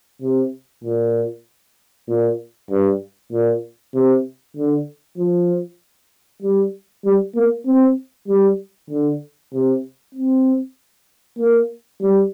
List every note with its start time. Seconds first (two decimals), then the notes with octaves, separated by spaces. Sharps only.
0.22 C3
0.84 A#2
2.08 A#2
2.70 G2
3.32 A#2
3.94 C3
4.56 D3
5.18 F3
6.42 G3
7.05 G3
7.36 A#3
7.66 C4
8.28 G3
8.90 D3
9.53 C3
10.15 C4
11.39 A#3
12.01 G3